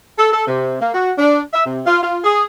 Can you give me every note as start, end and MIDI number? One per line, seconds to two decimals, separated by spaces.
0.18 0.32 69
0.33 0.45 69
0.47 0.78 48
0.81 0.90 58
0.94 1.12 66
1.18 1.41 62
1.54 1.66 76
1.66 1.80 48
1.87 2.00 65
2.02 2.18 65
2.24 2.44 68